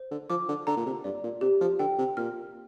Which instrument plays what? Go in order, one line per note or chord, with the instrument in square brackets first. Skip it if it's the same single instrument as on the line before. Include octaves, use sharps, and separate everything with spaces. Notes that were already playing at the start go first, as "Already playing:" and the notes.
Already playing: [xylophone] C5
[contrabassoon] D3
[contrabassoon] F3 [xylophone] D6
[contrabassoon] D3
[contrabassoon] D3 [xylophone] A#5
[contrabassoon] A#2
C3
[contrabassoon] G2 [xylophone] D5
[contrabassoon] A#2
[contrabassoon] C3 [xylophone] G4
[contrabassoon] F3
[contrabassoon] D3 [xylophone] G5
[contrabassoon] C3
[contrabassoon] A#2 [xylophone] F6